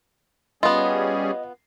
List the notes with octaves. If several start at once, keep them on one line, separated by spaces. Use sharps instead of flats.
G3 B3 C#4 F4 G#4 D#5